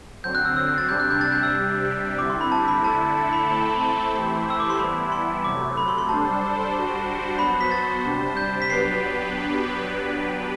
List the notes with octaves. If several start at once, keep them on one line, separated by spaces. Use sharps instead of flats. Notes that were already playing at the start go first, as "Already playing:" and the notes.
D3 F#3 C4 G6
F#6
E6
E6
F#6
A6
C3 G3 D4 G6
F#6
G6
A6
F#6
G6
E6
C3 G3 D4 G4
D3 G3 C4 E4 D6
C6
B5
A5
B5
D3 A3 E4 A4 A5
A5
B5
A3 C4 E4 A4 B5
B5
A5
E3 A3 E4 G4 C5
E6
D6
C6
E3 G3 B3 E4 B5
C6
C3 F#3 A3 D6
B5
C6
C6
G3 D4 A4 C5 A5
G3 D4 F#4 C5
F#3 B3 F#4 C5 B5
B6
A6
C3 G3 D4 G4 C5
G6
B6
F#3 B3 D4 G4 B4 C7